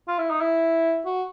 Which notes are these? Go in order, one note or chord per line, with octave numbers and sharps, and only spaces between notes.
F4
E4
D#4
E4
F#4